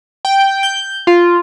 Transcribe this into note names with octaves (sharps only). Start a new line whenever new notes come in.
G5
G6
F4